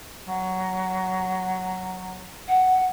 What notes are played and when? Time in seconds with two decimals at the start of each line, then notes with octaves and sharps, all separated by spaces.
0.26 F#3
2.48 F#5